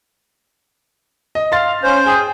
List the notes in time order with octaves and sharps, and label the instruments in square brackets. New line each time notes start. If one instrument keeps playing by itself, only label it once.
[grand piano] D#5
[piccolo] F5 [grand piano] C6 A6
[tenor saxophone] C#4 [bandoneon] C5 [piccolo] G6
[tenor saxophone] G#4 [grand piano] G5 D#6